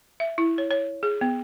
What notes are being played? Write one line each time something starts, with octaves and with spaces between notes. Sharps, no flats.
E5
E4
C#5
C#5
G#4
B3